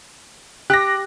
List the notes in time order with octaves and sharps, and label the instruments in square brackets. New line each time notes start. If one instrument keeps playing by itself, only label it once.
[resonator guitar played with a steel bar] G4 [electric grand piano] F#6 A#6